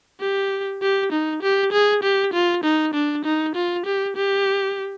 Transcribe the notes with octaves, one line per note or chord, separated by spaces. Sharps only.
G4
G4
D#4
G4
G#4
G4
F4
D#4
D4
D#4
F4
G4
G4